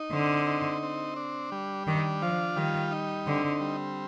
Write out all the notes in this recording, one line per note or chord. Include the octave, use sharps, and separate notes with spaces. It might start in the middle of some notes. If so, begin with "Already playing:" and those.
Already playing: D#4
D3 C4
D#4
C4
D4
G3
D#3 D4
F3 F4
D#3 G3
D#4
D3 C4
G3